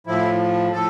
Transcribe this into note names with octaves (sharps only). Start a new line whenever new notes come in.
A2 F3 E4
A2 F3 A4